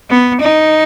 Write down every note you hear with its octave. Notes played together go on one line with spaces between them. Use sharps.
B3
D#4